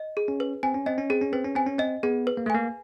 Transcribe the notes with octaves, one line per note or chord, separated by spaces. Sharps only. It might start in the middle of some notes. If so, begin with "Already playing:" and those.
Already playing: D#5
G#4
C#4
B4
C4 G#5
C#4
C4 D#5
C#4
C4 G#4
C#4
C4 B4
C#4
C4 G#5
C#4
C4 D#5
B3 G#4
B4
A#3
A3
A#3 G#5